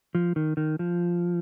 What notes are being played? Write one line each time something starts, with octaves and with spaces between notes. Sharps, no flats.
F3
D#3
D#3
F3